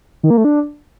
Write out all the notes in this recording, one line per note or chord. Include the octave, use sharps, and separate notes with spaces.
D#3
A#3
A3
D4